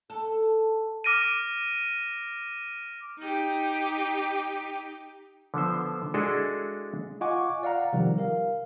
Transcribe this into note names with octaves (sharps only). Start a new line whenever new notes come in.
A4
D6 F6 A#6 D7 D#7
D#4 G4
D3 F3 B3 C5
G#3 D4 E4 F#4 G#4 A4
F4 D#5 F#5 G#5 C#6 D6
D5 F5 F#5 A#5
C3 D#3 F3 G3
A#4 F5